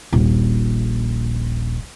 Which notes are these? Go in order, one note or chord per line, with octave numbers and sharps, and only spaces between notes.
D#1 A#1